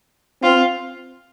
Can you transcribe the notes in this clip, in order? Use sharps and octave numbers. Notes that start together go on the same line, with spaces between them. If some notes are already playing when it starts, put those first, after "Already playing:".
C4 F4